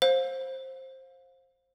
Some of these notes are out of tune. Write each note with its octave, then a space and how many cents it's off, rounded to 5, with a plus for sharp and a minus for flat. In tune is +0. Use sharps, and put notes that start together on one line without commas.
C5 +15 F5 +25